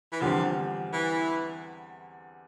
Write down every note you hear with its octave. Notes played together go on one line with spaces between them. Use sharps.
E3
E2 D3 F3 G3 C4
E3